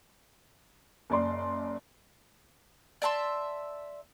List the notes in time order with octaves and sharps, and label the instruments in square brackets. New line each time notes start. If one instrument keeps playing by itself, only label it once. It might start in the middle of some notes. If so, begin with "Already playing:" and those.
[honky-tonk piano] F#1 D5 C6
[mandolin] D5 E5 A5 C6